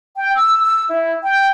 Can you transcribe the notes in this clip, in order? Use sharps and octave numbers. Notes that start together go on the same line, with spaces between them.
G5
E6
E6
E4
G5